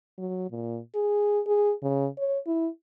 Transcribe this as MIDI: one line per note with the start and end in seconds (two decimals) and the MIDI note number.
0.18 0.48 54
0.51 0.79 46
0.95 1.40 68
1.47 1.73 68
1.83 2.07 49
2.18 2.38 73
2.47 2.67 64